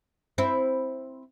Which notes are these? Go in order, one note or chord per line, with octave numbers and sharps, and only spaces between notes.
C4 E4